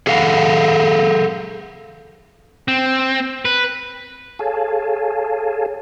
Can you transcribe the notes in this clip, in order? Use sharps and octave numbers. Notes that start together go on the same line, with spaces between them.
G#4 A4 F5 F#5
C4
B4
G#4 A4 C#5 F5 G#5 A5